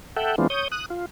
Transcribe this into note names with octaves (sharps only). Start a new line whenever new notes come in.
A4 E5 F#5 G5
E3 G#3 B3 C4 D4 F4
C#5 D#6 G6
D#6 F#6
F4